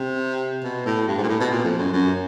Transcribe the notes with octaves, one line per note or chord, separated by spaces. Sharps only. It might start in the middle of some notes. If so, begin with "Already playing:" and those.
Already playing: C3
B2
A2
G2
G#2
A#2
A2
B2
A#2
F2
F#2
F#2